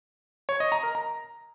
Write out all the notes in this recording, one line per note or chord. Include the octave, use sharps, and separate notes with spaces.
C#5
D#5
A#5
A#4
A#5